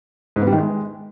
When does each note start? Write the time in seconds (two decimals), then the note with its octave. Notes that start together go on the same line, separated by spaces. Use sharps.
0.36 G#2
0.42 B3
0.47 G3
0.53 D#3
0.58 G#3